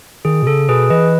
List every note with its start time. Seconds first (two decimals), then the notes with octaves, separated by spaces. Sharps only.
0.25 D#3 G#4
0.43 B2
0.47 C#3 A4
0.69 B2 G#4 B4
0.90 E3 B4 D#5